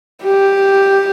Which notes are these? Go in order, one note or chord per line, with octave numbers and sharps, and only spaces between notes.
G4